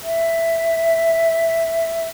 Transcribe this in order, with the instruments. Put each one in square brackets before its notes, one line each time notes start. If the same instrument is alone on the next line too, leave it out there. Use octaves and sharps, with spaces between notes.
[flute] E5